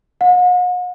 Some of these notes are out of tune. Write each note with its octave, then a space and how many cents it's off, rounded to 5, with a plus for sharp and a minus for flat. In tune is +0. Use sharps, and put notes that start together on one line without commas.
F#5 -45